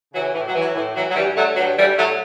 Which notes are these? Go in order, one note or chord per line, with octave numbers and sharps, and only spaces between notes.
C#3 E3 F#3
A2 E3
F#3
E3
F#3
A2 E3
E3 F#3
F#3
G2 E3 G3
D3 F#3 A3
G2 F#3
D3 E3 G3
A2 F#3 A3